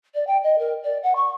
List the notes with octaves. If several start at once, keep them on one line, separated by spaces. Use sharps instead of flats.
D5
G5
D#5
A#4
D5
F#5
C#6